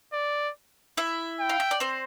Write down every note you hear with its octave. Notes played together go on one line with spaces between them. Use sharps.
D5
E4 E5
G5
F5
E5
D5
C4 C5